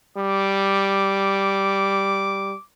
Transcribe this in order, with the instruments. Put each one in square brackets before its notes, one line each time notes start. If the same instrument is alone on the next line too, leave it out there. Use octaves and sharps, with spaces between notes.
[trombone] G3 [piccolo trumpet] D6